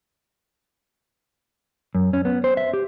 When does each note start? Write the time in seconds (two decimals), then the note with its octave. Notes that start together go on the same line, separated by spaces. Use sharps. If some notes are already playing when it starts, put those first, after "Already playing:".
1.95 F#2
2.13 C#4
2.25 B3
2.44 C5
2.57 E5
2.73 G4